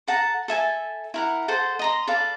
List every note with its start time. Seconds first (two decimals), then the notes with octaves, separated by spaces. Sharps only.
0.08 A4 F#5 A5 A#5
0.48 A4 E5 G#5 A5
1.14 E4 A#4 F#5
1.48 A4 C5 F#5 C6
1.79 D#5 A#5 C6
2.07 A4 B4 D5 F5